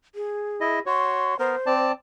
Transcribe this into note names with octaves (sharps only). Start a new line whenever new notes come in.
G#4
E4 D#5
F#4 C#5 C6
B3 A#4 C5
C4 D5 A5